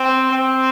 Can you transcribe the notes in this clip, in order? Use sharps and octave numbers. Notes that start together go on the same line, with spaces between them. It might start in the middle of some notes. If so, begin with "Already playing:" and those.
Already playing: C4
C4